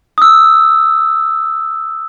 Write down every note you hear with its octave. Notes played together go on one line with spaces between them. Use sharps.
D#6 E6